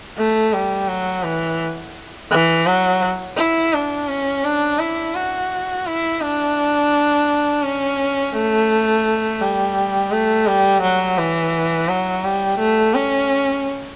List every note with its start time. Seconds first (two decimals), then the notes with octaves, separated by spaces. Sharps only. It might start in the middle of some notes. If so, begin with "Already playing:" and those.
0.18 A3
0.53 G3
0.89 F#3
1.25 E3
2.31 E3
2.66 F#3
3.37 E4
3.73 D4
4.08 C#4
4.44 D4
4.79 E4
5.15 F#4
5.86 E4
6.21 D4
7.63 C#4
8.34 A3
9.41 G3
10.11 A3
10.47 G3
10.82 F#3
11.18 E3
11.89 F#3
12.24 G3
12.59 A3
12.94 C#4